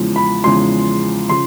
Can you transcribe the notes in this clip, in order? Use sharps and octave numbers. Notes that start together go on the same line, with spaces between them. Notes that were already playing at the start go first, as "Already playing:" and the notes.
Already playing: E2 C#3 F3 G#3
B5
E2 C#3 F3 G#3 C6
C#3 F3 C6